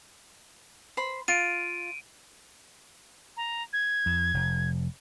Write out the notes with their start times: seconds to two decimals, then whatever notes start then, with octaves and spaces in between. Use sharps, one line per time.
0.97 C5 B5
1.28 F4 D7 D#7
3.37 A#5
3.73 G#6
4.06 F2
4.34 F1